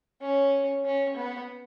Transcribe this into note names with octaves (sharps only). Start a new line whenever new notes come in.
C#4
C#4
B3